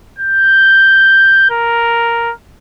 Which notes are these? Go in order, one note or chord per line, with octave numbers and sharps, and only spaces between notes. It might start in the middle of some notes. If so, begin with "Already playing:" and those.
G6
A#4